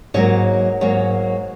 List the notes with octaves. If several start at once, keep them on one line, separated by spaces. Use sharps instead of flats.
G#2 F#3 A#3 C#5
G#2 F#3 A#3 C#5